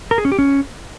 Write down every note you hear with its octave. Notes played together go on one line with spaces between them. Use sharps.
A#4
G#4
C#4
G4
C#4